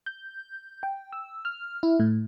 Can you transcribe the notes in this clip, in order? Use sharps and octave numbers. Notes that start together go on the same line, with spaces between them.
G6
G5
E6
F6
E4
A2